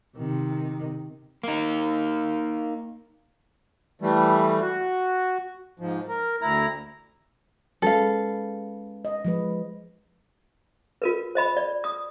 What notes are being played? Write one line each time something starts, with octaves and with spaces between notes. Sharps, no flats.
C3 D#3
A#3 D#4
E3 G3 A3
F#4
G#2 F3
A#4
D2 E4 A#5
G#3 C#4 A4 B4 F5
D#5
F3 G#3 B4
F4 A#4 B4
C5 D#5 B5
D5
D#6